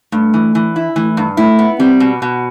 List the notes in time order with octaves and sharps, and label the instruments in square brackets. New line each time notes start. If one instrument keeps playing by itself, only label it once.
[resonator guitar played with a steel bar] G2 [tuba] A3
[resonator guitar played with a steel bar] E3
E3
E4
[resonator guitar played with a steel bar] E3 [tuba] A3
[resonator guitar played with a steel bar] G2
[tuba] A3 [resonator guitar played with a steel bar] E4
[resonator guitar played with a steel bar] B3
[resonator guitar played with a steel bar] G3 [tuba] C4
[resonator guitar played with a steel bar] B2
B2